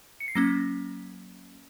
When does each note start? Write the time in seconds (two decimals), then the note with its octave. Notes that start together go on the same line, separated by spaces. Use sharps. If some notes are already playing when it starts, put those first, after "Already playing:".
0.20 C#7
0.28 C7
0.35 F#3 A#3 C#4 A#6